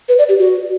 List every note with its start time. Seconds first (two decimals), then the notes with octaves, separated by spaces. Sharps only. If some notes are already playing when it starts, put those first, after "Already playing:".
0.09 B4
0.19 D5
0.29 G4
0.39 F#4